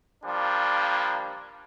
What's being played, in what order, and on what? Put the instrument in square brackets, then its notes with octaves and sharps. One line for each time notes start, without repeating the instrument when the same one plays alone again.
[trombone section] F3 G3 A#3 D4